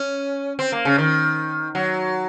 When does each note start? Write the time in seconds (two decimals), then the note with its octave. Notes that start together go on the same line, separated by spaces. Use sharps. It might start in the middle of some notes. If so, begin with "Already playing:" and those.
Already playing: C#4
0.59 C4
0.72 A#3
0.85 C#3
0.98 D#3
1.75 F#3